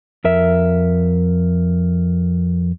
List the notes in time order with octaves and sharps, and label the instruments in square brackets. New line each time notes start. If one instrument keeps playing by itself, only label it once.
[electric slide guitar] F2 A#4 E5